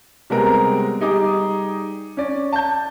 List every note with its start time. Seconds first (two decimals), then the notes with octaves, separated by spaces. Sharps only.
0.30 C3 G3 G#3 B3 C4 A#4
1.01 G3 D#4 G#4 D6
2.17 C#4 D5
2.53 A5 G6